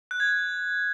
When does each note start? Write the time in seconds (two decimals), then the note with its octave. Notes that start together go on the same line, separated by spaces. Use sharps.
0.11 F#6
0.20 G#6
0.29 F#6